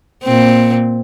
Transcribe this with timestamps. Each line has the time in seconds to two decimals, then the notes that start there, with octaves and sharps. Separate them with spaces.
0.24 A#2 C4